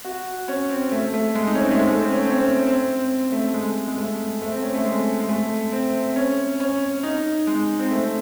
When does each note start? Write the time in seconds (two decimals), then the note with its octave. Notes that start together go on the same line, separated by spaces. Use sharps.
0.05 F#4
0.48 C#4
0.70 C4
0.92 A3
1.14 A3
1.35 G#3
1.47 D#4
1.55 C#4
1.63 C4
1.71 A3
1.79 G#3
1.90 A3
2.01 C4
2.12 C#4
2.23 C4
2.30 C#4
2.38 C4
2.66 C4
3.32 A3
3.54 G#3
3.88 G#3
3.98 A3
4.42 A3
4.52 C4
4.63 C#4
4.74 A3
4.85 G#3
5.20 G#3
5.29 A3
5.72 C4
6.16 C#4
6.60 C#4
7.03 D#4
7.47 G#3
7.79 C4
7.91 A3